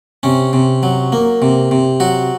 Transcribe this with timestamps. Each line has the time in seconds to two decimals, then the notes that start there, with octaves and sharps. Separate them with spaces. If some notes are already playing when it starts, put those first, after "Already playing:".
0.23 C3 C#4
0.53 C3
0.83 F#3
1.12 A#3
1.42 C3
1.71 C3
2.00 F#3 F#4